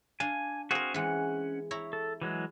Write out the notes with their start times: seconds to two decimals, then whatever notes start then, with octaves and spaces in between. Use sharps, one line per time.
0.20 D4 D5 F5 G#5
0.71 C4 F#4 G#4 A#4 F5
0.94 E3 G#3 C#4 F#5
1.71 E4 C#5 A#5
1.93 A4
2.21 E3 F#3 G#3